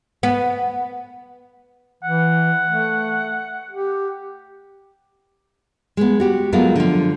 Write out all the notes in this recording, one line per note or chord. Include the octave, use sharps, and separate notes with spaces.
B3
E3 F#5
A3
G4
G#3 B3
F#4 G4
F#3 G#3 A3 B3 F4 A#4
D3 F3